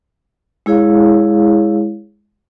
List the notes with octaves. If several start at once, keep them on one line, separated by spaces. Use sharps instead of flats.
G#3 E4 G#4 C#5 F5